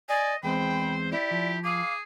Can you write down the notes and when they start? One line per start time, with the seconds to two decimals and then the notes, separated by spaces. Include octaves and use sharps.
0.09 D5 D#5 G#5
0.43 E2 G#3 C4 C5 G5 B5
1.11 E4 G4 D5
1.31 F3
1.64 G#4 F5 D6